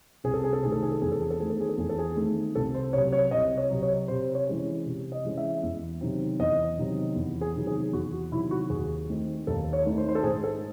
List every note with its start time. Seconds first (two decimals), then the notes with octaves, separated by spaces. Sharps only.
0.24 C2 G#4
0.34 A4
0.44 G#4
0.53 A4
0.63 C3 D#3 A3 G#4
0.72 A4
0.82 G#4
0.92 A4
1.02 E2 G#4
1.12 A4
1.21 G#4
1.31 A4
1.40 D#3 A3 C4 G#4
1.50 A4
1.60 G#4
1.69 A4
1.78 E2 G#4
1.89 A4
1.99 G#4
2.16 D#3 A3 C4
2.55 C2 A4
2.75 C5
2.93 C3 F#3 C#5
3.13 C#5
3.31 C2 D#5
3.58 C#5
3.70 C3 F#3
3.83 C#5
4.08 C3 C5
4.35 C#5
4.47 E3 G#3 C#4
4.86 C3
5.12 D#5
5.25 E3 G#3 C#4
5.38 E5
5.63 E2
6.01 C3 D#3 F#3 C4
6.39 E2 D#5
6.78 C3 D#3 F#3 C4
7.16 E2
7.41 G#4
7.55 C3 D#3 F#3
7.67 G#4
7.93 E2 F#4
8.12 F#4
8.31 C3 D#3 F#3 E4
8.51 F#4
8.70 D#2 G#4
9.09 D#3 A3 C4 D#4
9.47 D#2 A4
9.73 C#5
9.86 D#3 A3 C4 D#4
9.98 C5
10.08 C5
10.15 A4
10.23 G#2 G#4
10.44 A4